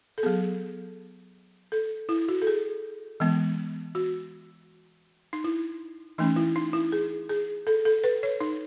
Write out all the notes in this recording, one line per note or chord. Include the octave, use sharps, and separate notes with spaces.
A4
F#3 B3 G#4
A4
E4
F#4
A4
G#4
E3 G#3 B3
F#4
D#4
E4
E3 A3 C#4 D#4
E4
D#4
E4
G#4
G#4
A4
A4
B4
C#5
D#4